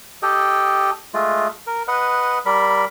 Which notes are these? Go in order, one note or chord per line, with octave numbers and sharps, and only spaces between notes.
G4 A4 D#5 G5
G#3 A3 F4
A#4
B4 D#5 F#5
G3 A#4 B5